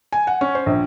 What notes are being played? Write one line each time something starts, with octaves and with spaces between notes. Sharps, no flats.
G#5
F#5
C#4
C5
A#1